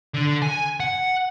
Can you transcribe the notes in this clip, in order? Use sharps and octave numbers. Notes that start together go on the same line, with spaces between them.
D3
G#5
F#5